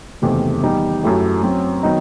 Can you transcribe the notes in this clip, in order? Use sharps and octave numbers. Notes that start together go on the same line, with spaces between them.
F#1 E2 C3 D#3 A3
E2 D#3 G3 D#4
F#2 F#3 A3 E4 G4
F#2 F#3 C4
D#3 F#3 B3 D#4